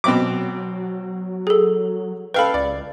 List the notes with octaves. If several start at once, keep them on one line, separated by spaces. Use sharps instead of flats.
B2 F#3 C4 D6
G#4 A4
A4 B4 F5 G5 B5
C#2 D5